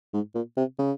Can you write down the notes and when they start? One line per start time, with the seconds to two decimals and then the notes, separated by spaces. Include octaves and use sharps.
0.13 G#2
0.35 A#2
0.57 C3
0.79 C#3